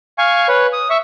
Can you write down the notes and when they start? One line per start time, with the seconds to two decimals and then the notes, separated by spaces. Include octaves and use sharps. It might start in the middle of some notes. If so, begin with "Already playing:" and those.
0.18 F5 G#5 C#6
0.48 B4 C#5
0.73 D#6
0.90 E5 C#6